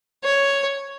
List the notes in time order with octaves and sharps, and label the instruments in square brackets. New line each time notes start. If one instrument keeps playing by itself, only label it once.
[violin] C#5